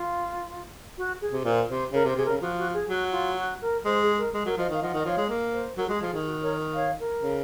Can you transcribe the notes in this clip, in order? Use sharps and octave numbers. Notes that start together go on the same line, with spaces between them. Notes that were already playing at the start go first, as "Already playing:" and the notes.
Already playing: F4
F#4
G#4
C3
A#2 C5
C3 C5
C#3 A#4
C3
C5
C3 G#4
C#3 A#4
F3 F#4
F#4
G#4
F#3 F#4
F4
F#4
A#4
G#3 C5
G#4
A#4
G#3
F#3 A#4
F3 C5 D#5
D#3 F5
F3 D#5 F#5
D#3
D#5
F3 C#5 F5
G#3
A#3
C5
F#3 A#4
G#3 F#4
G#4
F3
D#3 G#4
F#4
A#4 C#5
C#5 F5
A#4
C#3